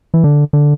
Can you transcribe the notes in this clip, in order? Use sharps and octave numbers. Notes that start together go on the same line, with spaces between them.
E3
D3
D3